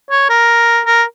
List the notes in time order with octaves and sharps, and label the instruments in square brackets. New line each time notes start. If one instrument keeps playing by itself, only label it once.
[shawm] C#5
A#4
A#4